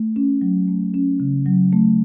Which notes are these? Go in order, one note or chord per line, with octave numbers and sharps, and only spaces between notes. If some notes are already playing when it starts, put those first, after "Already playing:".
Already playing: A3
C#4
F#3
A3
C#4
C#3
F#3
A3